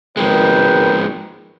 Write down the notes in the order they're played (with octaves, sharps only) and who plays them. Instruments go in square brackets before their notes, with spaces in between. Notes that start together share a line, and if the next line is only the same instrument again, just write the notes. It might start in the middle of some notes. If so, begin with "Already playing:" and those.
[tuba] G#1 [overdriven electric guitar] F3 G#3 [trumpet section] A#4 B4 G5